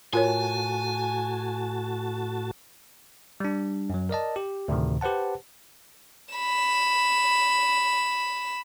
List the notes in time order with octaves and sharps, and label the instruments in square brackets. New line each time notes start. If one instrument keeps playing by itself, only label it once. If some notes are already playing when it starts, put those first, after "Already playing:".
[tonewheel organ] A2 F#4 A5 [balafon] F4 A#4 C#5 [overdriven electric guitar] G#5
[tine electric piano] G3 D4
F#2 F#3
A#4 D5 D#5 A5
G4
D2 A2 C3 D#3
G4 B4 C5 F#5 A5
[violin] B5 E7